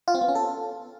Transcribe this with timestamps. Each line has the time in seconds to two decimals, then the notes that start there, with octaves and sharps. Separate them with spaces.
0.08 F4
0.15 C4
0.21 B3
0.28 C#4
0.35 A4